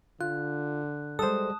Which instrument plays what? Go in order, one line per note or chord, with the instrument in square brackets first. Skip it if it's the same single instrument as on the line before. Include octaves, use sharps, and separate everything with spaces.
[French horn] D3 [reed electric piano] F4 [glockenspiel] F#6
[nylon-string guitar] G3 G#3 [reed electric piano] A4 C5 [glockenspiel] A5 D#6